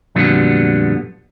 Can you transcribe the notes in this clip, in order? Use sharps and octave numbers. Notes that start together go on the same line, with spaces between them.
F2 A#2 D3 F#3 G3 B3